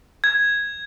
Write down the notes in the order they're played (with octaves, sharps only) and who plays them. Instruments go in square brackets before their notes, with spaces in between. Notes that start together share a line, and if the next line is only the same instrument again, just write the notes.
[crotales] G#6